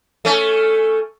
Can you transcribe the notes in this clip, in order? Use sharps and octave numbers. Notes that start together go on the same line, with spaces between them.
A3 C#4